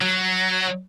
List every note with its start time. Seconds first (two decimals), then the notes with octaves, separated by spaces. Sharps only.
0.01 F#3